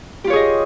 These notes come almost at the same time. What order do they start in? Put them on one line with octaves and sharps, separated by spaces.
G4 F4 C#5 G#4 D#5